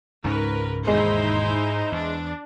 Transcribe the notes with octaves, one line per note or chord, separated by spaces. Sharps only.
C#2 G#2 G#3 C#4 A#4 B4
E1 D#2 G#3 D#4 E4 C5
E2 D4